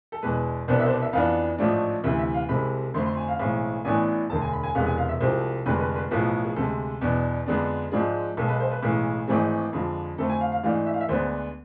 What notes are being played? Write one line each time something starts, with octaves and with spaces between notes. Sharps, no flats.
A4
E2 B2 G#3 B4
C2 B2 B3 D4 C5
E5
C5
D5
E5
F2 E3 B3 D4 F5
A1 G#2 F3 A3 D4
D2 C3 E3 E5
E5
F5
C2 C3 G#3 C4 B5
F2 D3 A3 C4 C6
C6
G#5
F5
B1 A2 E3 G#3 C4
A1 A2 E3 B3 D4 G#5
E1 D2 D3 A5
G#5
B5
G#5
E1 E2 C3 G#3 B3 F5
G#5
F5
E5
C2 C3 F3 G#3 C4 C5
F1 F2 D3 G#3 B4
B4
B4
B1 A2 F3 B3 G#4
G#4
D2 C3 G#3 A4
E2 B2 B3 D4
F2 D3 G#3 B3 D4
G#2 F3 G#3 D4 G#4
B1 B2 G#3 A4
B4
C5
B4
B1 A2 E3 G#3
G#1 G#2 E3 A3 C4 G#4
F2 D3 F3 G#3
F2 D3 A3 C4 A4
G#5
F5
F5
G#2 E3 A3 D4 F5
E5
F5
E5
D2 D3 G#3 B3 D4 C5